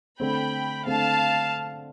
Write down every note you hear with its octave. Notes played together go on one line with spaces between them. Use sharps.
D3 A3 C4 G5 B5
D3 A3 C4 F5 A5